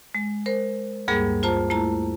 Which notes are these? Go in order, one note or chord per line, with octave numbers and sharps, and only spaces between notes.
G#3
A#4 C5
D2 G2 G3 A#3 G#4 A#4
F4 C5 A5 A#5
A3 E4 A5 A#5